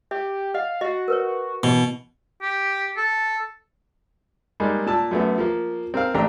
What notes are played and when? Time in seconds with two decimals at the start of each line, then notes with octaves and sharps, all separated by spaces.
0.11 G4 E5
0.54 D#5 F5 F#5
0.81 F#4 D#5 F#5
1.08 A#4 B4 C#5
1.63 B2 E3
2.42 G4
2.97 A4
4.60 G3 G#3 A#3 D#4
4.86 A#2 A5 E6
5.11 F#2 A3 B3
5.38 F3 A#3
5.94 C4 A#4 F5
6.14 A1 A3 D4 G4 A#5